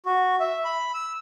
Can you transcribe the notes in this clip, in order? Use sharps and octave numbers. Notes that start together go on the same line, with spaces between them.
F#4
E5
B5
E6